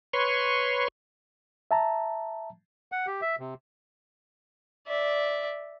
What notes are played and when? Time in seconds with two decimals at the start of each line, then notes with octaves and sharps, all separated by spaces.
0.13 B4 C#5 C6 C#6
1.71 E5 A5 A#5
2.92 F#5
3.07 G4
3.21 E5
3.40 C3
4.87 D5 E5